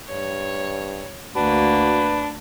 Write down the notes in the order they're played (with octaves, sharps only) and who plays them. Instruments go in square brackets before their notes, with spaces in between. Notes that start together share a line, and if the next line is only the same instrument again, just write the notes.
[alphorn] G2 [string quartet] C#5
[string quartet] D2 A#3 [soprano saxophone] D4 [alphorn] F#4 [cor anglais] B4